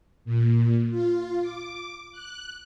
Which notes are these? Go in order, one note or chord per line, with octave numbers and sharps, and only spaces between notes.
A#2
F4
D6
F#6